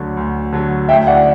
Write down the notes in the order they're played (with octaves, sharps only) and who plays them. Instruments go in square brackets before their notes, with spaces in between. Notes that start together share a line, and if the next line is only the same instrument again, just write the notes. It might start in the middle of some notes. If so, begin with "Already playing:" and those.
Already playing: [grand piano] D2 D3 F#3
D2
D3 F#3
[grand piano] D2 [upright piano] E5 G5
[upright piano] D5 F#5